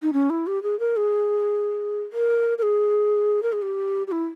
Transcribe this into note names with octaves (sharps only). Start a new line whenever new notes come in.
D#4
C#4
E4
G4
G#4
A#4
G#4
A#4
A#4
G#4
A#4
G#4
G4
G4
E4